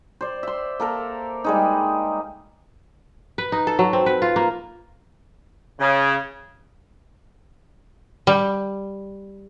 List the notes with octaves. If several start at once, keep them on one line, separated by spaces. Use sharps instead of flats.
C5 D5
E5 C6
A#3 A4 A#4
G3 G#3 D#4
B4
D#4
A4
F#3
C4
B4
F4
A#3
C#3
G3